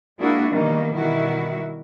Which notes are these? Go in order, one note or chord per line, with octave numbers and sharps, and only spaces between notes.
G#3 A#3 D4 E4 F#4 G#4
B2 D#3 E3 G3 A#3
B2 D#3 G3 E4 F#4